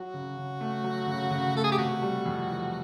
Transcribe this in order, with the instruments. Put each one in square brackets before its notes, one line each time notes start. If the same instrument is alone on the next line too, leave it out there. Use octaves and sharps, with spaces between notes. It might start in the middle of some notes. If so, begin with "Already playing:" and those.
Already playing: [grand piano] F#3 [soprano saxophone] F#4
[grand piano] C#3
C#3
A3
F#3
C#3
C#3
[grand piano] A3 [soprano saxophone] A4
[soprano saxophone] G#4
G4
[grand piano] C3 [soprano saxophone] F#4
[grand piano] G3
F2
E3